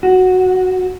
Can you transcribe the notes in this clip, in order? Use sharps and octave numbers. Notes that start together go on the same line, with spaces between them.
F#4